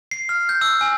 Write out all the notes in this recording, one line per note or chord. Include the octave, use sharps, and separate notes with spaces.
C7
F6
G6
E6
G#5